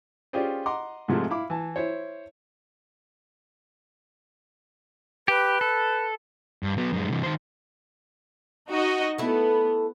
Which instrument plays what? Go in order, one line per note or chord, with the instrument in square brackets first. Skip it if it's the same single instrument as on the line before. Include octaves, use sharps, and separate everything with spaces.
[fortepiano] C#4 F4 G4 G#4 C5 D5
D#5 F#5 A#5 C6 D6
G#2 C3 F3 G#3 A3
E4 F5 B5 D6
E3 A5
E4 C5 C#5
[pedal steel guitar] G4 [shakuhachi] B4
[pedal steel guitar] A4
[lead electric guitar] G2
F#3 B3
F#2 G#3
C3 E3
D#3 C5
[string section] D#4 F#4 D#5
[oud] A3 E4 [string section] B3